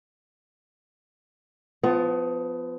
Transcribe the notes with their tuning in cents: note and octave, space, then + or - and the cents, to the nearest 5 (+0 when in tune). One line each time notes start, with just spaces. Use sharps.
F3 +0 B3 +30